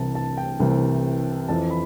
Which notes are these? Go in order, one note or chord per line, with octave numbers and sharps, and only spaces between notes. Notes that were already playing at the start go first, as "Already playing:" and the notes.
Already playing: C2 C3 E3 A5
A5
G5
C2 C3 E3
F2 E3 A5
B5